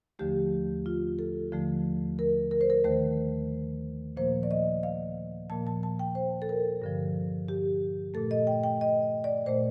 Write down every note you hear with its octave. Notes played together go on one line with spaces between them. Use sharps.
D#2 D3 F3 A3 G4
F4
A4
D#2 D3 F3 A3
A#4
A#4
C5
A#4
D#2 D#3 A3 C5
A#2 F3 A#3 C5
D5
D#5
F5
A#2 F3 A#3 A5
A5
A5
G5
C5
A4
A#4
G2 D3 F3
G4
A#2 A3 A4
D#5
G5
G5
D#5
D5
A#2 A3 C5